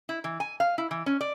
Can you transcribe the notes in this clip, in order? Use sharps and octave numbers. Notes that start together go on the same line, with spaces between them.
E4
E3
G#5
F5
E4
E3
C#4
D5